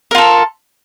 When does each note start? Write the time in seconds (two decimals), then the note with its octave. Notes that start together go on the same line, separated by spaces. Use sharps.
0.11 A#4
0.15 F4
0.18 A4